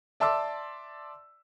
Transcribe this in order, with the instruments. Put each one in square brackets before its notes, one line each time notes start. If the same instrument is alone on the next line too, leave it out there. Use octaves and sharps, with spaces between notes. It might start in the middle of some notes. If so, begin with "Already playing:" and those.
[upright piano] D5 E5 A5 C6 D6 E6